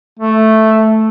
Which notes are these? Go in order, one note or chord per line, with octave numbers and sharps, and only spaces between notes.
A3